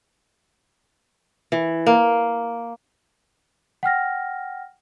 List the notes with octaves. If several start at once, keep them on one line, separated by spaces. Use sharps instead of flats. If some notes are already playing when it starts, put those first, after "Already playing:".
E3
A#3
F#5 G5 F6 A#6